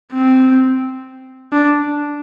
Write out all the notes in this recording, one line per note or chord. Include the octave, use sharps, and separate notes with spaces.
C4
D4